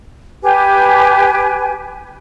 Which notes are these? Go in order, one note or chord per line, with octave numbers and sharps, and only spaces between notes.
G4 B4 G#5